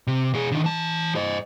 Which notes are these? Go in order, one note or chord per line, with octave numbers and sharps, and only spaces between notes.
C3
B2 G#4
D3 D#3
E3 A5
C5 D#5